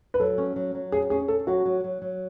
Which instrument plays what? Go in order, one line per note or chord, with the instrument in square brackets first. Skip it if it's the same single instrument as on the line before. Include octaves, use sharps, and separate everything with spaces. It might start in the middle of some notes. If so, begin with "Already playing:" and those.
[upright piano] B4
[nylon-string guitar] F#3 [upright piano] A4
[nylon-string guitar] C#4
F#3
F#3
[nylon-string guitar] C#4 [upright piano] G#4
[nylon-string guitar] C#4 [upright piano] G#4
[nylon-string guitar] C#4 [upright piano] A4
[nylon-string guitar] F#3 [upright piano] F#4
[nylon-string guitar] F#3
F#3
F#3